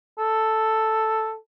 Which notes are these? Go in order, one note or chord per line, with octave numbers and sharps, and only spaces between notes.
A4